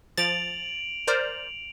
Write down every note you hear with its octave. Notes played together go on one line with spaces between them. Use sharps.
F3 A6 D7 F7 F#7
A#4 C5 D5